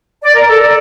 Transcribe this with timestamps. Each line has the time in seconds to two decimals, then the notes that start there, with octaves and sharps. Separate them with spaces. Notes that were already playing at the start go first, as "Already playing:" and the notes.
0.22 D5
0.33 A#4
0.48 A4
0.61 D5